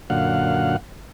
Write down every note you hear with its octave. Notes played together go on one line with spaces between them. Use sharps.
F#2 A#2 D3 F5 F#5